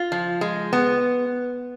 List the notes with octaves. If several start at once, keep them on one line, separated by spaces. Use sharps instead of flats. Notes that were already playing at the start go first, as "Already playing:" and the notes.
Already playing: F4
F3
G#3
B3